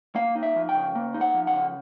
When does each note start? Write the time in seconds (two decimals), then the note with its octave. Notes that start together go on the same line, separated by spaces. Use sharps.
0.15 A#3 F5
0.35 D#4
0.43 E5
0.56 F3
0.69 G5
0.75 C#3
0.95 A#3
1.14 D#4
1.21 F#5
1.34 F3
1.47 F#5
1.54 C#3